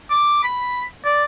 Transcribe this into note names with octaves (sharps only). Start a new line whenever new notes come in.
D6
B5
D5